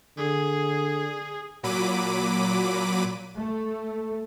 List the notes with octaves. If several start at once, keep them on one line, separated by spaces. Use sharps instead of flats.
D3 G#4
A#2 F#3 B5 D6 D#7
A3